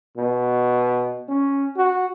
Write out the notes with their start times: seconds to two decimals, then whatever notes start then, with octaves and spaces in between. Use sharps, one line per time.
0.18 B2
1.29 C#4
1.77 F#4